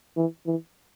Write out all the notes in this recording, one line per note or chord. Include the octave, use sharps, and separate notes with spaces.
E3
E3